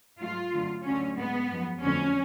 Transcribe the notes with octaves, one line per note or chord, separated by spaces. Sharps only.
G#2 F#3 A3 F4
F#2 D3 F#3 A3
D2 D3 F#3 A3 C#4
G#2 G#3 B3
F#2 F3 G#3
F2 D3 F#3 A3 C#4